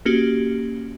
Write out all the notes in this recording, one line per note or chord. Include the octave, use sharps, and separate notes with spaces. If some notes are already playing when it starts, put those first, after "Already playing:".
A#3 C#4 F#4 G4